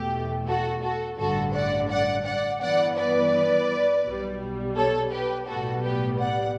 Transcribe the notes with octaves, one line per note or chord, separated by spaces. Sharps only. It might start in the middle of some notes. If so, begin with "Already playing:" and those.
Already playing: E2 B2 A3 G4
F#4 A4
F#4 A4
A1 G2 D3 F#4 A4
D5 F#5
D5 F#5
D5 F#5
G2 E3 B3 D5 F#5
B4 D5
B1 B2 G3
A4 C#5
G4 B4
B1 A2 G3 B3 F#4 A4
G4 B4
D5 F#5